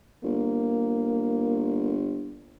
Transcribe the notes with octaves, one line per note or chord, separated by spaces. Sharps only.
G1 A#3